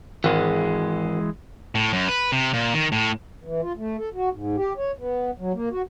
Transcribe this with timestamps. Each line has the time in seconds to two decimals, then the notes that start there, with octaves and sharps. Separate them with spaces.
0.24 G#1 E3 G#3
1.75 A2
1.93 F#2
2.08 B4
2.32 C3
2.53 A#2
2.74 D#3
2.92 A2
3.44 E3
3.62 F4
3.77 A3
3.98 A4
4.14 F#4
4.32 G#2
4.57 G4
4.77 C#5
4.98 B3
5.39 F#3
5.54 A#3
5.71 F#4